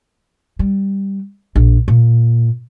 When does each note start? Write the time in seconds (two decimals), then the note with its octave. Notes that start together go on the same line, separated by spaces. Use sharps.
0.59 G3
1.56 A#1
1.88 A#2